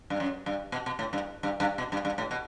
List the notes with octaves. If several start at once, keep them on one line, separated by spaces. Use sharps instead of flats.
G2
F#2
G2
B2
B2
A2
G2
G2
G2
B2
G2
G2
A2
B2